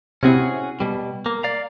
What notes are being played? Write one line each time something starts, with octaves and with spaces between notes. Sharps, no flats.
C3 C4 C#4 E4 F#4 G#4
B2 G3
A#3
D5 F5 A#5